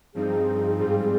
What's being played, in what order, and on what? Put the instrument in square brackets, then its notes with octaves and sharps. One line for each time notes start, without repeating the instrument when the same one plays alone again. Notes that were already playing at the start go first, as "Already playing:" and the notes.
[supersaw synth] G2 F3 C4 D#4 [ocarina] G#4
[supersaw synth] G#2 G3 C4 F4